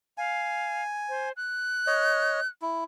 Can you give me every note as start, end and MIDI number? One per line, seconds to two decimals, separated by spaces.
0.18 0.83 77
0.18 1.29 80
1.09 1.32 72
1.37 2.48 90
1.87 2.40 73
1.87 2.40 75
2.62 2.84 64